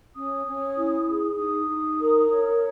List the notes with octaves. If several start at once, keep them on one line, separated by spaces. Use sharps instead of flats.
C#4 D#6
C#4
E4
G#4
D#4 D#6
D#4
A#4
C#5